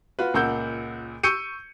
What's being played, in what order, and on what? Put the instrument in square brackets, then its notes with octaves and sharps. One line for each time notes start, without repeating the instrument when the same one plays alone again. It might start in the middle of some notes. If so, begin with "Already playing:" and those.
[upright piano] F4 F#4 B4
C#2 A#2 A#4 F#5 E6 G6
C#6 E6 G6 C#7 D#7